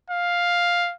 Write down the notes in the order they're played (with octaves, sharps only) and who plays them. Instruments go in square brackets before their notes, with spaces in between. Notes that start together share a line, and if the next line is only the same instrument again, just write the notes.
[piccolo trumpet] F5